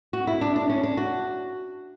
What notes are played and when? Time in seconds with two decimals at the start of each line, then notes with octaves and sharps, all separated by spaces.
0.13 F#4
0.27 E4
0.41 D4
0.56 D4
0.70 C#4
0.83 D4
0.97 F#4